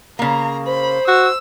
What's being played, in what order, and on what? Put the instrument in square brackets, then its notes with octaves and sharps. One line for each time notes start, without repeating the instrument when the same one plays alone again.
[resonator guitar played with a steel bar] C#3 A#3 [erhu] A#5
[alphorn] C5 [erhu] B5
[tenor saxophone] F#4 [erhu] E6